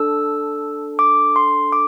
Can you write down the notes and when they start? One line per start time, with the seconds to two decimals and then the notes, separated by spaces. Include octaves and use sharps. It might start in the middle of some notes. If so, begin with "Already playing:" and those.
Already playing: D4 A4 E6
0.99 D6
1.36 C6
1.73 D6